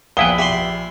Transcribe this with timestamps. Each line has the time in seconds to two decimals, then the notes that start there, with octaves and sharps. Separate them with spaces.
0.17 A#1 E2 E4 B4 F5 G5 D#6 G7
0.38 G4 E5 B5 C6